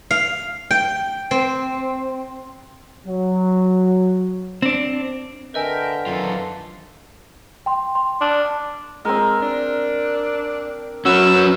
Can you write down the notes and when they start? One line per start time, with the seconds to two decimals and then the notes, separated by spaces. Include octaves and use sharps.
0.11 F5
0.71 G5
1.31 C4
3.07 F#3
4.62 C4 D4
5.54 D3 A#4 B4 D#5 E5 G5 G#5
6.07 F#2 D#3 E3 F4 A4
7.66 G5 C6
7.95 C6
8.21 D4
9.05 G#3 C4 A#4
9.42 D4
11.05 F#3 C#4 F#4 B4 E6